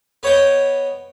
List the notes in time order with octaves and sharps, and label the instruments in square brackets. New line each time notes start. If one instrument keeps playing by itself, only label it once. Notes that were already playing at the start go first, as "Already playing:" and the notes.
[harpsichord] B3 C#5 D#5 G5